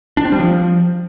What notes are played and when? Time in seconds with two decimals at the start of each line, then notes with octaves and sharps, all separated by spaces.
0.17 D4
0.25 C4
0.32 G3
0.40 F3